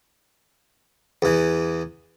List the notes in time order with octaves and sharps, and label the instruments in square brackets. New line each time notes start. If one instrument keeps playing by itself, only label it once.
[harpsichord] E2 E3